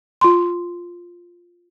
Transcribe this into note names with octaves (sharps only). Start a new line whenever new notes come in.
F4 C6